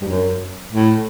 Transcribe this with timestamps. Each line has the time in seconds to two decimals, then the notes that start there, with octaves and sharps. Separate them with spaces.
0.01 G2
0.08 F#2
0.72 A2